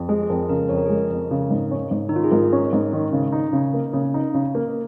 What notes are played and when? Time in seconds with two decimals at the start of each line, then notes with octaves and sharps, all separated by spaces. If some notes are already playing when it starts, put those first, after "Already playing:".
Already playing: F2
0.09 G#3 G#4
0.23 G#4
0.29 F2 A#4
0.49 C#3 A#4
0.69 F2 C#5
0.78 A#4
0.86 G#4
0.90 G#3 A#4
1.10 F2
1.31 C#3
1.50 G#2
1.71 C#4
1.91 G#2
2.09 D#3 D#4
2.16 F4
2.24 G#4
2.32 G#2 A#4
2.53 C#4
2.73 G#2
2.93 D#3
3.12 C#3
3.32 D#4
3.53 C#3
3.74 A#3
3.93 C#3
4.14 D#4
4.34 C#3
4.55 A#3